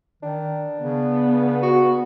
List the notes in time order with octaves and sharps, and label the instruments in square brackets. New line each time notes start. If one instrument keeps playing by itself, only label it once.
[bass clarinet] D#3 [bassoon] D4
[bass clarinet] C#3 [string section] B3
[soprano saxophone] F#4